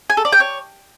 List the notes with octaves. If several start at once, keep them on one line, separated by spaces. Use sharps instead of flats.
G#5
A4
D5
G5
C#5